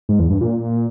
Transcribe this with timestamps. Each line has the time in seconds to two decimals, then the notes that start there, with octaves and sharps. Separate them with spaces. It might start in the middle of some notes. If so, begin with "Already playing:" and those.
0.09 G#2
0.19 E2
0.30 G2
0.41 A#2